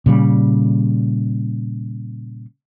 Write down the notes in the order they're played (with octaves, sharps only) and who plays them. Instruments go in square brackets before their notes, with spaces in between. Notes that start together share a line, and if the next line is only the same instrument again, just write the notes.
[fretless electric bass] A#2 C#3 G3